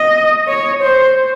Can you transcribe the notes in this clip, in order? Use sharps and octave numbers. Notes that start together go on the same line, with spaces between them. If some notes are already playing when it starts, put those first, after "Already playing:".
Already playing: D#5
C#5
C5